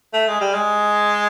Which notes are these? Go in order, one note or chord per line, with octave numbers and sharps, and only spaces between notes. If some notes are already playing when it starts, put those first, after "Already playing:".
A3
G#3
G3
G#3